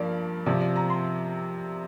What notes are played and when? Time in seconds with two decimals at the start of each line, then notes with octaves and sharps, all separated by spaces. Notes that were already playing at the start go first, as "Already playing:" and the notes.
Already playing: G2 F3 A#3 D5
0.46 C3 F3 C4 D5
0.61 D5
0.76 A#5
0.90 C6